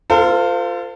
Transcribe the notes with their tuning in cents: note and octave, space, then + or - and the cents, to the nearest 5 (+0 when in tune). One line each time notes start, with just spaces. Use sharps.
F4 +0 A4 +40 C5 -30